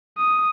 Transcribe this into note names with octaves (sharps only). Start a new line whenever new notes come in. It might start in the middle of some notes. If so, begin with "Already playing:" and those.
D#6